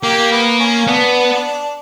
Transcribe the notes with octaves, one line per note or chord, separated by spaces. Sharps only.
A#3 G4
B3
C#4
B3 D4